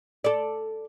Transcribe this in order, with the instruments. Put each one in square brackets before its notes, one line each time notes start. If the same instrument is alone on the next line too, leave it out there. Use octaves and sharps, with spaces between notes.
[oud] A4 D5